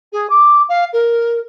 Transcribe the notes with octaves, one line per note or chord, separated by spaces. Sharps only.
G#4
D6
F5
A#4